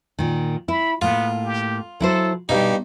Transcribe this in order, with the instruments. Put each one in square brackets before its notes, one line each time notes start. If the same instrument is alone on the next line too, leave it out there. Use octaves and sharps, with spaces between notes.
[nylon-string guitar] A#2 D#3
[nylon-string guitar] E4 [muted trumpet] B5
[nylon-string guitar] A2 A#3 [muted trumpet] B3 [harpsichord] F4
[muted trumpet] G4
[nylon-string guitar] F#3 E4 C5 [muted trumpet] A4
[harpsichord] G2 D#4 [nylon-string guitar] B2 [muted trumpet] G4